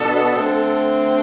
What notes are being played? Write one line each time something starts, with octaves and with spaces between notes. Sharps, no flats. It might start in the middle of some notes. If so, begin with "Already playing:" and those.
Already playing: B2 B3 D4 A4
D3 A3 C4